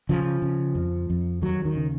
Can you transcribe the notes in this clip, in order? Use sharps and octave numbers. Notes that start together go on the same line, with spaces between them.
C#3 F3
C#3
F2
F2
D#2 F#3
D#3
C#3